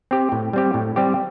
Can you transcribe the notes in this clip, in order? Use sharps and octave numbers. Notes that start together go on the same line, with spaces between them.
C4 G4
A2
G3 C4 G4
A2
G3 C4 G4